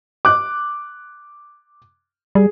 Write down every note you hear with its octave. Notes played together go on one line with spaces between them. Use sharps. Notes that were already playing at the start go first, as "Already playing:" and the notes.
D6 F#6
G3 G#4